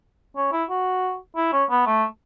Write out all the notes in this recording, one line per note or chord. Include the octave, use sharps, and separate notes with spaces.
C#4
E4
F#4
E4
C#4
B3
A3